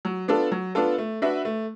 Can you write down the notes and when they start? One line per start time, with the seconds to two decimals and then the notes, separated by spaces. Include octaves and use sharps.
0.05 F#3
0.28 B3 D4 F4 A4
0.52 F#3
0.75 B3 D4 F4 A4
0.98 A3
1.22 D4 F#4 B4 E5
1.45 A3